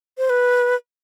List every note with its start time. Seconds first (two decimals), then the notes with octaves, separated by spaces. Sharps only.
0.18 C5
0.30 B4